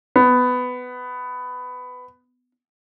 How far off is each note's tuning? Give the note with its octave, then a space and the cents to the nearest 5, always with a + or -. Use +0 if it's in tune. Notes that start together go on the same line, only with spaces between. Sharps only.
B3 +15